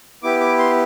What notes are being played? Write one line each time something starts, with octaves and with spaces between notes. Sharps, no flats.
B3 E4 G4 D6
D6
C6